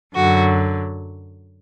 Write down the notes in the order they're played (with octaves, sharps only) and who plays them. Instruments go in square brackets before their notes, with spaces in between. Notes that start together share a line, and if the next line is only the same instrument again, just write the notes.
[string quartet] F#2 D3 F#3 F#4